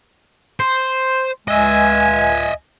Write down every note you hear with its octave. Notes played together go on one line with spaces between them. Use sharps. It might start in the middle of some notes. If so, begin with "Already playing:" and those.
C5
C#2 G#3 D#5 E5 G#5